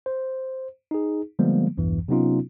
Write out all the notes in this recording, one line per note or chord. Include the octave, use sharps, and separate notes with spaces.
C5
D#4 G#4
D3 F3 G3 G#3 A#3 B3
B1 E2 G2 E3
C3 F#3 B3 C#4 D#4 F4